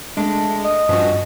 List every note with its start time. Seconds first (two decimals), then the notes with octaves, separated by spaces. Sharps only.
0.17 G#3 A3 D4
0.65 D#5
0.89 G2 F3 C#4 F#4